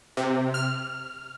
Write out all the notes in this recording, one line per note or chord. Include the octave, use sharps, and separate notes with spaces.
C3
F6